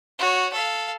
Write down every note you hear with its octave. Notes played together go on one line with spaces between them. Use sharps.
F#4 C#5
A4 F5